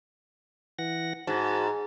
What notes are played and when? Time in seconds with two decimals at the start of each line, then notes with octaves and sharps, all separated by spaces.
0.79 E3 F#5 A#6
1.27 G#2 F#4 A5